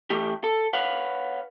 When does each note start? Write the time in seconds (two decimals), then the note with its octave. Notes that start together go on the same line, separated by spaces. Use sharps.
0.10 E3 A3 G4
0.44 A4
0.73 B4 C#5 F5 F#5